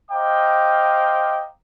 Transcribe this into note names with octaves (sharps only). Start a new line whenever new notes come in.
C5 D#5 F5 G5 A#5 D6